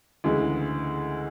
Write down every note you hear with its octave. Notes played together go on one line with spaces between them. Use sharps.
D2 C#3 E3 G#3